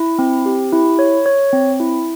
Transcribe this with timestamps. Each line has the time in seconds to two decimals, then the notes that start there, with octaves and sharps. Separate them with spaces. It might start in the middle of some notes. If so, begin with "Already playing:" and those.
Already playing: E4
0.19 C4
0.46 G4
0.72 E4
0.99 C#5
1.26 C#5
1.53 C4
1.80 E4